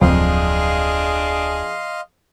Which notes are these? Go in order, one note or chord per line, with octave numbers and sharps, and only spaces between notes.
D1 F2 D4 G#4 D#5 F5 C6